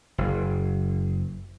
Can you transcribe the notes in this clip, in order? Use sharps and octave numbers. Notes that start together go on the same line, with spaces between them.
F#1